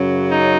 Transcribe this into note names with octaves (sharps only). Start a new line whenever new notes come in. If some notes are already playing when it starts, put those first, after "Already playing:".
Already playing: F#2 C#3 F#3
D#4